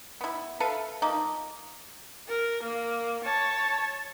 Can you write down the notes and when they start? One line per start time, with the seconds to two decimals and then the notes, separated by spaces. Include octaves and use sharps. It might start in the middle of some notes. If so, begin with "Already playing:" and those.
0.21 B3 E4
0.60 A4 B4 E5 F5
1.02 F3 A#3 D#4
2.28 A#4
2.63 A#3
3.24 C#5 A5